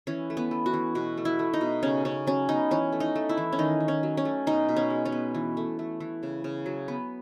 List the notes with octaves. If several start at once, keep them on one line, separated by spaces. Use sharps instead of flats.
E3 C#4
A3
B3
A3
F#4
E3
B2 F#4
A3
E4
A3
D#4
B2
C#3 C#4
C#3 C#4
F#3 C#4
B3 D#4
E3 C#4
A3
D#4
A3
E4
E3
C#4
D#3 D#4
D#3
C#4
F#3
C#4
A3
B2 D#4
B2
C#4
G#3
C#4
B3
E3
A3
A3
E3
C#3
C#3
F#3
B3